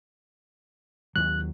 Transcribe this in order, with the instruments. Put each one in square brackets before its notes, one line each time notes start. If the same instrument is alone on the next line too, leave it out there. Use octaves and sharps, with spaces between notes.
[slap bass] D#2 F#3 [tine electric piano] F#6